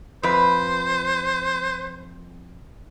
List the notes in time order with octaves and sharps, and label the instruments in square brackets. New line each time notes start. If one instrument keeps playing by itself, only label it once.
[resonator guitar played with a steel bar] F2 B4 [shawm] C5